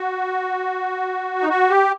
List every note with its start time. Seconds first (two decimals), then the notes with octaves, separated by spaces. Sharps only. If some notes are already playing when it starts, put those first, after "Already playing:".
Already playing: F#4
1.42 D#4
1.49 F#4
1.70 G4